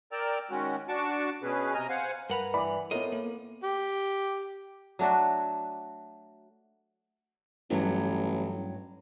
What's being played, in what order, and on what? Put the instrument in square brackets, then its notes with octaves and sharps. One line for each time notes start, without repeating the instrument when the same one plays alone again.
[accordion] A#4 D5 G5 E6 F6
D#3 G#3 C#4 F#4
D4 F#4 A5 C#6 D6
B2 C#4 G#4 B4
C3 D#5 G#5 A#5 F6
C5 F5 F#5 G#5
[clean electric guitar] G2 F#5 A#5 [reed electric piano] A#4 B4 B5
[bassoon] E3 [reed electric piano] D5 [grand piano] B5 D6
[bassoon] A2 [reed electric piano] B3 A#4 [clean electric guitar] F4 D#5
[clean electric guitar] A#3
[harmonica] G4
[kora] F#3 A3 D4 F#4
[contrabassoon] A1 [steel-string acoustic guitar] G2 F#3